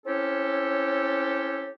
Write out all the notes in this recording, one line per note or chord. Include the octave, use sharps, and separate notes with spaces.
C4 C#4 E4 G4 A4 C#5